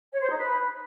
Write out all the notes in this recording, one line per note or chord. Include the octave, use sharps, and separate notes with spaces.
C#5
C5
D#4
B4